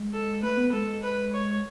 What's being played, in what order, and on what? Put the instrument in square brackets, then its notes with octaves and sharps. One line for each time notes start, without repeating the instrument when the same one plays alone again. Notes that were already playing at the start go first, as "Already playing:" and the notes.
Already playing: [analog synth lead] G#3
[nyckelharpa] A4
[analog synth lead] A3 [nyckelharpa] B4
[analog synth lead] B3
[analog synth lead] G#3 [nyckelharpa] A4
[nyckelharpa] B4
C#5